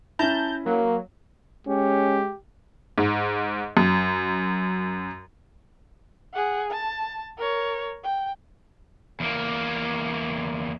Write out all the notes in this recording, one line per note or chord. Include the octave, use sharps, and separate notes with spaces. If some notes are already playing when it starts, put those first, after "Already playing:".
C#4 E4 A5 A#5 G6
F#3 A#3
G#3 C#4 G4
G#2
F#2
G#4 F#5
A5
A#4 C#5
G5
E2 A#3